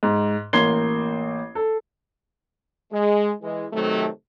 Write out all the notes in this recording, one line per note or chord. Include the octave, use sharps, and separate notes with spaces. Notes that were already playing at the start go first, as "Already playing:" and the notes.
G#2
A1 A#3 C6 G#6 C7 G7
A4
G#3
E3 G#3
C3 D#3 F#3 A3